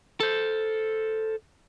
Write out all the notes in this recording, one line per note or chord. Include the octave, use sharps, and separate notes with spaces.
A4 C5